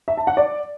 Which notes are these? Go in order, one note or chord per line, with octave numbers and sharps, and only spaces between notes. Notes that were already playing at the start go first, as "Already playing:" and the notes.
E5
A5
F#5
D5